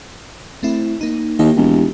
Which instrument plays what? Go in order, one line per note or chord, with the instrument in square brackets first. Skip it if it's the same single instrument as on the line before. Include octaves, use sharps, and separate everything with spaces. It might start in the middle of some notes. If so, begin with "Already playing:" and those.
[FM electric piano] A3 C4 E4
A#3 D#4
[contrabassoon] D#2 [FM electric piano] A#3 E4 G4
[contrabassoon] E1